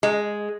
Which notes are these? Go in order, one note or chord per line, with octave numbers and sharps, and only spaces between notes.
G#3